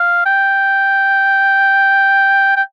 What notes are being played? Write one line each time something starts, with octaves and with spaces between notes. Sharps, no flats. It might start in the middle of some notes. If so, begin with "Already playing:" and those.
Already playing: F5
G5
G5